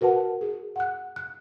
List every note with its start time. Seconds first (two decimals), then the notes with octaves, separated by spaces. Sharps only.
0.01 F#4 A#4 B4 F#5 A5
0.41 G#4
0.76 F#5 F#6
1.16 F#6